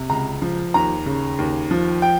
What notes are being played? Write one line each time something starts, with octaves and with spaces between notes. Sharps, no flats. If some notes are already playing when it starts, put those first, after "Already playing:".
Already playing: C3
C#2 A#5
F3
D#2 A#5
C#3
D#2
F3
G5